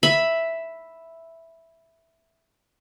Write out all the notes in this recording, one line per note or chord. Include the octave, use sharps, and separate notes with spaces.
E5 B5